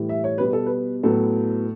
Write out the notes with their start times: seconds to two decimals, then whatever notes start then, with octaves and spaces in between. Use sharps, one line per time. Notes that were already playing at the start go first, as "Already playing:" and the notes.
Already playing: A2 E3 G3
0.09 E5
0.24 C#5
0.38 B2 G3 B3 B4
0.53 A4
0.66 B4
1.03 A2 F#3 B3 A4